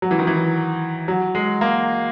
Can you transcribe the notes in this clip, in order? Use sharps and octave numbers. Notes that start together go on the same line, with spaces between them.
F#3
E3
D#3
E3
F#3
G#3
A#3